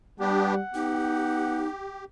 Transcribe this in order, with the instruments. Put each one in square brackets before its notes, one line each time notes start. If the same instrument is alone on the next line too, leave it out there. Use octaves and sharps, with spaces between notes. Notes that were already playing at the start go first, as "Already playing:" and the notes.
[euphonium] G3 [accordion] B3 D4 G4 [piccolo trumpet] F#5
[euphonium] B3 [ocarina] D#4 [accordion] G4